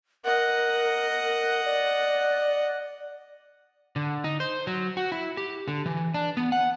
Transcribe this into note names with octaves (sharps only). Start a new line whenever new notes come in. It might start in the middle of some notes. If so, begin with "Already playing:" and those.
A#4 D#5 F#5
D5
D3
D#4
C5
F#3
F#4
E4
G4
D3
E3
D4
B3
F#5